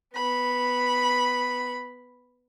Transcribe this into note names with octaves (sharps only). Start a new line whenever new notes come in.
B3 B5